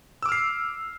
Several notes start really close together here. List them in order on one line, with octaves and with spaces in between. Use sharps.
E6 D6 F6 C7